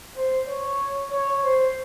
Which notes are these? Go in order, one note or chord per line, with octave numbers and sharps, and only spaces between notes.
C5
C#5
C#5
C5